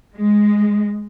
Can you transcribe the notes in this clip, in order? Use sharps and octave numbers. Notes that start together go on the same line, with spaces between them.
G#3